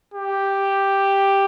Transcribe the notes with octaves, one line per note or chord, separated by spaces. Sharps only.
G4